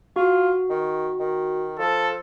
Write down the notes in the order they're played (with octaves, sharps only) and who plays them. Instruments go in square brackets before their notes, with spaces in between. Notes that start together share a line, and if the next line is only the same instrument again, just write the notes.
[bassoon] F4 [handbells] F#4
[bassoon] D#3
D#3
[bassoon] F3 [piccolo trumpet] A4